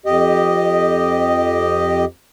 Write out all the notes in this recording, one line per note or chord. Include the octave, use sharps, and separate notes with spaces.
F2 G4 D#5